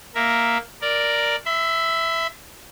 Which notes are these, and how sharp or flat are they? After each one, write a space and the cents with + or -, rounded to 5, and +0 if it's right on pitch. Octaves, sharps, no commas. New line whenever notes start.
A#3 +0 A#4 +0 E5 +0
A#4 +0 D5 +0
E5 +0 B5 +45